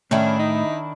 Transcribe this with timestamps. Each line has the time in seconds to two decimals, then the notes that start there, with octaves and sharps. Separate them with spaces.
0.11 A2 D#3 C#4 D4 E4
0.39 D#4